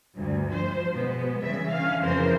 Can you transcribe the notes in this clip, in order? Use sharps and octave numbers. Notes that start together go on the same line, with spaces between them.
D2 G2
F3 C5
B2 G#3 B3
C#3 E3 G3 E5
D3 C#4 F5
F2 C#3 E3 F3 A#4 C5